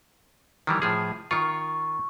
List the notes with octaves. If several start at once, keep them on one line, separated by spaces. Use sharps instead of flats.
D#3 E3 G3
A2 F3 G#4
D#3 F4 C#6